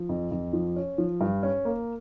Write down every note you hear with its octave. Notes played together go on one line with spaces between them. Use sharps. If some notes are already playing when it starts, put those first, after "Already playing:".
Already playing: F3
F2
F2
F3
C#4
F3
G2
C#4
A#3